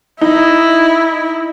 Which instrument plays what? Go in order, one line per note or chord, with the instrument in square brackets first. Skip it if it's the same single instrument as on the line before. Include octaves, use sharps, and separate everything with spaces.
[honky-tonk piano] D#4 [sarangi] E4